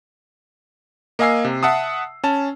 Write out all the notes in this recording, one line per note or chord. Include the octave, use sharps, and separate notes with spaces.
A#3 D#5 F5 G#5 E6 C7
C3
E5 F#5 A5 D#6
C#4 A5